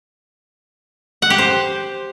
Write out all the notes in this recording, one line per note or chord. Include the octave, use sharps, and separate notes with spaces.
F#5
G4
C5